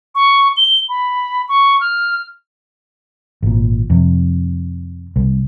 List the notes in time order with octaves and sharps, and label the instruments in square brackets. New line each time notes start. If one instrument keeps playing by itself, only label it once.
[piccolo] C#6
G7
B5
C#6
F6
[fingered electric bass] G#1 A#2
F2 C3
C2